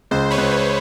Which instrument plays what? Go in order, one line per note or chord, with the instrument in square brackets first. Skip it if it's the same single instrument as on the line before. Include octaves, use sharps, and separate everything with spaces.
[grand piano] C#2 [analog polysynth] C5
[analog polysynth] B4 C#5
[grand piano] C#2
[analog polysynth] B4